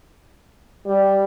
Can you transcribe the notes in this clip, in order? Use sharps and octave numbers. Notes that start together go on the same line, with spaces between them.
G3